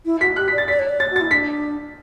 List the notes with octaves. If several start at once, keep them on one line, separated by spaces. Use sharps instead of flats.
E4
F#4 B6
G4 F#6
D5 B6
A6
D5 B6
C#5
D5
C#5 A6
F#4
E4 A6
D4 B6